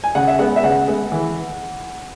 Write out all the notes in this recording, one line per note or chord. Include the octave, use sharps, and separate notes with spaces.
G#5
C#3 F#5
E5
G#3 B3 F#5
E5
C#3 F#5
G#3 B3
E3